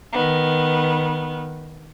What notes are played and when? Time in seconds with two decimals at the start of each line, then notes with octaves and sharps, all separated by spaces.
0.12 D#3 B3